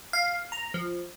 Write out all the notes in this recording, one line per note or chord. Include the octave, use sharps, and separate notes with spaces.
F5
A#5
F3